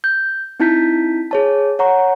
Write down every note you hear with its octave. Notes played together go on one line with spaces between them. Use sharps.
G6
C4 D#4 E4 A5 G6 B6
G#4 C#5 A5
C#5 F#5 A#5 C#6